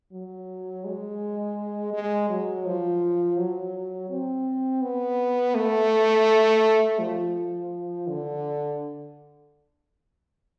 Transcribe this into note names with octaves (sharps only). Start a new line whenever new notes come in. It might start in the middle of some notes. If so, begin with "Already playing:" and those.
F#3
G#3
G#3
F#3
F3
F#3
C4
B3
A3
F3
D3